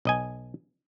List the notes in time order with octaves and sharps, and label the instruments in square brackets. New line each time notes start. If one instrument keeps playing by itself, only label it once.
[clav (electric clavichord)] B1 D#5 G#5